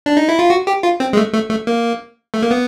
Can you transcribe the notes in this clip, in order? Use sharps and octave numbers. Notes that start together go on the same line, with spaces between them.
D4
D#4
E4
F4
F#4
G4
F4
C4
G#3
A3
A3
A3
A#3
A3
A#3
B3